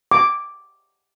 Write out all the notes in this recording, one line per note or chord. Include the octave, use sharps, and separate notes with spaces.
D6